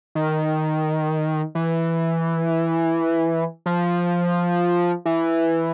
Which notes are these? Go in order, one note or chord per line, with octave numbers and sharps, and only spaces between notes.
D#3
E3
F3
E3